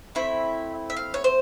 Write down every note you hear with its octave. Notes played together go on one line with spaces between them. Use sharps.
A3 C4 E4 E5
E5
F5
C#5
C5